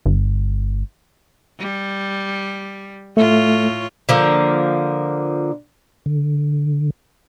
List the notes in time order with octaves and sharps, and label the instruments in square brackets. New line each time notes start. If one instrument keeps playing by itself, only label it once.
[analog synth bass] G1
[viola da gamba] G3
[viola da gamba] A2 F4 C#5 [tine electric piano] A3
[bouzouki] D3 F3 A#3
[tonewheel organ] D3